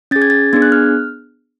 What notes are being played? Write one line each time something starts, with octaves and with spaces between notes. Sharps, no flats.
C#4 G#4 A6
G#6
A6
B3 D4 G#4 G#6
F#6
F6